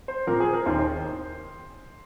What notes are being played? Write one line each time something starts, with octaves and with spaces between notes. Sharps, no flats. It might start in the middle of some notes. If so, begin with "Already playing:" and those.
C5
A#2 F3 C4 A#4
G#4
A#4
D#2 D#3 C4 C5